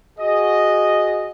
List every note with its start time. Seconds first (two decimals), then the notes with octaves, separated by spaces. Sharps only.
0.18 F#4 G#4 D#5